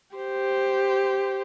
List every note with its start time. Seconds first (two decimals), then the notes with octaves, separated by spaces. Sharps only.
0.16 G4 C5